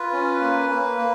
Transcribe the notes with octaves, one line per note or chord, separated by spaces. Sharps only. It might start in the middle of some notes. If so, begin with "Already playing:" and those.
Already playing: F4 B4
C#4
A#3
A#3
A#3